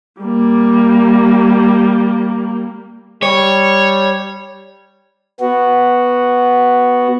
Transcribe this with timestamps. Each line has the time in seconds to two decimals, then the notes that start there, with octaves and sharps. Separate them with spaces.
0.21 G3 A#3
3.23 G3 C#5
5.40 B3 F#4